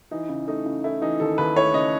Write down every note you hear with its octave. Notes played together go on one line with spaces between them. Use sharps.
E3 D#4
C#3
A3 D#4
C#3
A3 E4
E3 D#4
D#2 A4
D#2 B4
A3 C#5
C#3 D#5